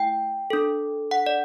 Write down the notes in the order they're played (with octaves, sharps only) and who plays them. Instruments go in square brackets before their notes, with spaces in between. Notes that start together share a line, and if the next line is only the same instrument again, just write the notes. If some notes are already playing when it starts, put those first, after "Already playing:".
Already playing: [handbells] A3 E4 G5
D4 A4
F#5
D5